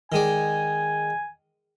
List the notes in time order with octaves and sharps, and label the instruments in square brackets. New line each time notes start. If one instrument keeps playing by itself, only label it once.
[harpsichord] D#3 G#3 D5 [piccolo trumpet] G#5